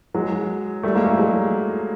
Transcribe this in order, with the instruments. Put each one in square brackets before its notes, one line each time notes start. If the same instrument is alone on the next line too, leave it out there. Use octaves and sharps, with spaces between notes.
[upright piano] F#3 G#3
G3 A3
G#3 A#3
G3 A3
F#3 G#3